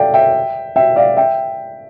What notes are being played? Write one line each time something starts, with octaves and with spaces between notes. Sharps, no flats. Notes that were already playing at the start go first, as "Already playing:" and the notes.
Already playing: A4 D5 E5 F5 G5
E5 G5
E5 G5
D5 F5
E5 G5